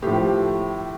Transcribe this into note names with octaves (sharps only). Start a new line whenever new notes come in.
A2 F3 G4